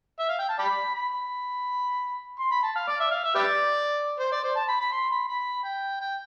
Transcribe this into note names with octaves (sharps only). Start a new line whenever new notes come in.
E5
F5
G5
A5
D5 G5 B5
B5
C6
B5
A5
F5
D5
E5
F5
E5
G4 B4 D5
C5
D5
C5
A5
B5
B5
C6
B5
B5
G5
G5